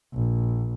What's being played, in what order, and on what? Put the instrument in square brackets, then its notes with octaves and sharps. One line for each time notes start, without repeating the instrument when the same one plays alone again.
[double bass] A#1